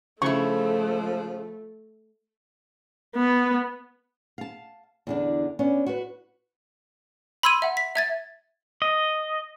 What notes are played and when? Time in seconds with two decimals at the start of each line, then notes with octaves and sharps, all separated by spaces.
0.22 C#3 F3 A3 E4 C#6
3.16 B3
4.38 F5 A5
5.07 E2 D3 D4
5.59 B3 C#4 D4
5.86 F#4 B4
7.43 B5 C6 E6 G#6 D#7
7.62 E5 F#5
7.77 B6
7.95 E5 G#6 A6
8.82 D#5